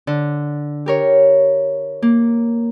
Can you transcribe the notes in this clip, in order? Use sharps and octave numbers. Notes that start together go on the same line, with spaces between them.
D3
G4 A#4 C#5
A#3